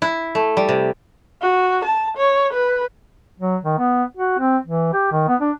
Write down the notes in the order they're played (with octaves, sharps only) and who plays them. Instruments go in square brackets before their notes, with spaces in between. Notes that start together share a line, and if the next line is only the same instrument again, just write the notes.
[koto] E4
A3
G3
C3
[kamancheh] F#4
A5
C#5
B4
[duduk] F#3
D#3
B3
F#4
C4
E3
G4
D#3
B3
D4